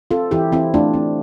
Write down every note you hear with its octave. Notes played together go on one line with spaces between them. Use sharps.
C4 F4 A4
E3 E4 G4
E3 C4 E4
A3 D4 F4
C4